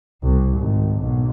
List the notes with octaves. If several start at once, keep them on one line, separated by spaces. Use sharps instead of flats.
C2
G#1
B1